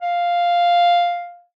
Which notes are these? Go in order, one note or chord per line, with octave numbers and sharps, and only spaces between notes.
F5